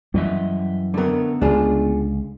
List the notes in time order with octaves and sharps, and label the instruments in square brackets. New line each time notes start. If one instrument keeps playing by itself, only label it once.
[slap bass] F#2 E3 [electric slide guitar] G3 D#5 E5
[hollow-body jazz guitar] D3 A#4 [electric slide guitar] A3 B3
[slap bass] C#2 D3 [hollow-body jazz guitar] D4 F4 G#4